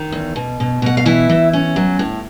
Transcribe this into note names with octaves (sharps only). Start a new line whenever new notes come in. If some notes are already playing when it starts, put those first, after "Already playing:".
Already playing: D#3
E2
B2
B2
B2 F#5
F5
E3 E4 E5
E3
C#4
F#3
A2